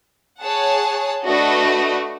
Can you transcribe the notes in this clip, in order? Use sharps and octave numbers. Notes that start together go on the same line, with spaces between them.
G#4 C#5 F#5 A5
A3 D4 F#4 B4 D#5